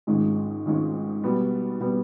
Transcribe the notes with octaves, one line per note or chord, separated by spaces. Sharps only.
G#1 G#2 F3 G#3 C#4
G#1 G#2 F3 G#3 C#4
B2 G3 B3
B2 G3 B3